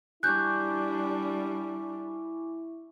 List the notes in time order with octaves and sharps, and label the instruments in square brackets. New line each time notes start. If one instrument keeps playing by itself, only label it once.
[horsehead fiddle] G3 D4 [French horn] E4 [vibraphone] G#5 C#6 D6 [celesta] F#6 G6